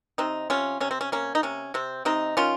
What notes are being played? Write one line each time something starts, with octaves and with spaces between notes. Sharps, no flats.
C3 C4 D#4
C3 C#4 F4
C3 C#4
C4
C#4
A#3 C#4
D#4
C3 C#4
C3 C4
C3 C4 D#4
D#3 C#4 F4